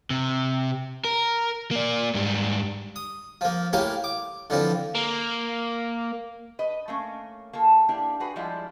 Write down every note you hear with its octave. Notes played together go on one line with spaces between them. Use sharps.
C3
A#4
A#3 D5
G#2 G3
D#6
F3 A#3
A2 A#3 G4 A#4 G#5
D6
D3 E3 F3 C4
A#3
B4 D#5
A3 A#3 C#4
A#3 F4 A4
A#3 D4 E4 G4
F#4 G#4 B4
F3 G3 G#3 D4 E4 F4